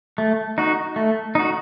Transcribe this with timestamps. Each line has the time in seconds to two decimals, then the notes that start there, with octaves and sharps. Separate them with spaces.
0.18 A3
0.58 D#4 F#4
0.96 A3
1.35 D#4 F#4